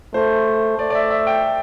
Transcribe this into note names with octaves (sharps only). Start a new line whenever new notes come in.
A3 C5
A3 D5
D5
E5
E5
G5